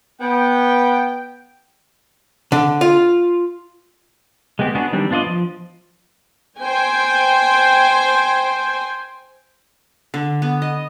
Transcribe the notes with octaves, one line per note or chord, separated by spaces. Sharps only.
B3 G5
D3
F4
G#3 B3 C4 G4
B3 D4 F#4 G#4
D#3 E3 G3 C4 D4
B3 D4 F4 D5 D#5
F3
C5 G5 G#5
D3
B3
D#5